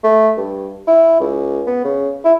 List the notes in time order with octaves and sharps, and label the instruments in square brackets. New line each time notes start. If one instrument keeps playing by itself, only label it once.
[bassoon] A3
G2
E4
C#2
B3
C#3
E4